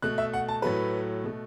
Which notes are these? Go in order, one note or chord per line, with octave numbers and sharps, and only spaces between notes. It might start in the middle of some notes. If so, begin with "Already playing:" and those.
B2 A3 F#6
E5
F#5
A5
A2 F#3 A3 B4
B2 A3